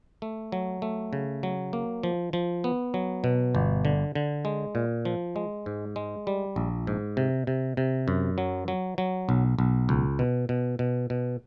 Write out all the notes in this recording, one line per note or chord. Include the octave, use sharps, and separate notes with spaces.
A3
F#3
A3
C#3
F#3
A#3
F3
F3
B3
F#3
B2
G1
D3
D3
G#3
A#2
F3
G#3
G#2
G#3
G3
A#1
G#2
C3
C3
C3
F#2
F#3
F#3
F#3
B1
B1
C#2
B2
B2
B2
B2